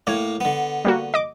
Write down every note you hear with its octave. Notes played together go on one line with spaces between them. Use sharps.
A2 A#3 C#5
D3 B3
G3 A#3 F#4
D#5 D6